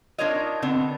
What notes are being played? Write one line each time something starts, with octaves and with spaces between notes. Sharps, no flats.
D4 D#4 F4 A#4 C#5 D#5
D3 B3 C4 D4